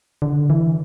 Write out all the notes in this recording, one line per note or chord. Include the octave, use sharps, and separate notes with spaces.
D3
E3